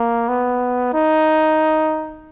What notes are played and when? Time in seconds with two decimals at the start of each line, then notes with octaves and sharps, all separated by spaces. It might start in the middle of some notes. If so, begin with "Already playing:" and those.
Already playing: A#3
0.29 B3
0.94 D#4